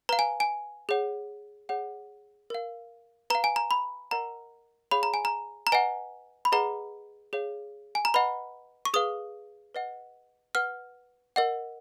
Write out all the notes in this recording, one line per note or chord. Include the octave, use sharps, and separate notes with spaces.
B4 F5 A#5
G#5
G#5
G#4 C#5 F#5
G#4 C#5 F#5
A#4 F5
B4 F5 A#5
G#5
A#5
B5
A#4 D#5 F#5 A#5
G#4 C#5 F5 B5
A#5
G#5
A#5
A#5
B4 D#5 F#5 G#5
B5
G#4 B4 D#5 F#5 A#5
G#4 C#5 F5
G#5
A#5
B4 D#5 F#5 B5
C#6
G#4 B4 F5 D#6
B4 D#5 F#5
B4 F#5 F6
A#4 D#5 F#5